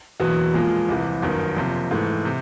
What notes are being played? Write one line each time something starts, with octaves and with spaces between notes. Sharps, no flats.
F#1 E2 B2 F#3 B3
A#2 F3 G#3
C2 C3 E3
G1 F#2 D#3
F#1 F2 C3
G#2 E3 A3
C3